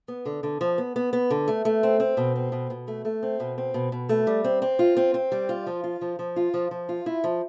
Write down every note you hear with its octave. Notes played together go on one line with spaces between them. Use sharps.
B3
D3
D3
F3
B3
B3
B3
D3
A3
A3
C4
C4
B2
C4
B2
B2
A3
A3
C4
B2
C4
B2
B2
A3
G3
C4
C4
F4
C4
C4
G3
F4
F3
F4
F3
F3
F4
F3
F3
F4
E4
F3